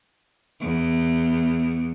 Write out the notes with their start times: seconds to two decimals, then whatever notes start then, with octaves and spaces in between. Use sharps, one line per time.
0.61 E2